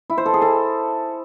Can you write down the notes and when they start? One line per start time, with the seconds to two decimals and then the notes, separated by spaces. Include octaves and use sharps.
0.10 E4
0.18 C5
0.26 A4
0.34 G#4
0.42 A4